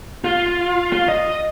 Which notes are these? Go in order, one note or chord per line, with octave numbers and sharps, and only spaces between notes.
F4
F4
D#5